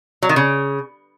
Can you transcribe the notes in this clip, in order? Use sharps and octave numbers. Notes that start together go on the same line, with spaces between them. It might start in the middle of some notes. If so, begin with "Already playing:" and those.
F#3
D#3
C#3